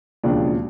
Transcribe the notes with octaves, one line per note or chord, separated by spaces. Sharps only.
E1 D#2 C#3 F3 D4